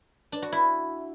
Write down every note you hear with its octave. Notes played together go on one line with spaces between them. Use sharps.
D4
F#4
E4